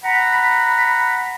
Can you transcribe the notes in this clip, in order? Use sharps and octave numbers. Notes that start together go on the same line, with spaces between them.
F#5 A#5 B5